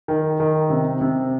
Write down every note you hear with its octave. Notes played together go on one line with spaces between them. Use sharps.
D#3
D#3
C3
C3